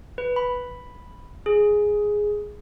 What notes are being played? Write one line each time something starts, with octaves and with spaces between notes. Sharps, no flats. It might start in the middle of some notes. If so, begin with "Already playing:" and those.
B4
B5
G#4